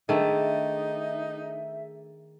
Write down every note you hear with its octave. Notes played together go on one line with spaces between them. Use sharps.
D#3 A3 D4 D#4 G#4 E5